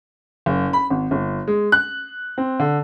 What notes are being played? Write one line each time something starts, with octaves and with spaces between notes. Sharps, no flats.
F#1
B5
G#1
G1
G#3
F#6
C4
D3